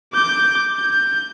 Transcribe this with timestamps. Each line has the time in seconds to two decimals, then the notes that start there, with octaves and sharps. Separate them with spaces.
0.13 D6 G6
0.77 G6